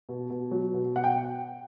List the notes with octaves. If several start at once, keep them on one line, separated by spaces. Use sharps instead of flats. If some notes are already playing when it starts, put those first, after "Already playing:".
B2
B2
F#3
B2
B2 F#5
G5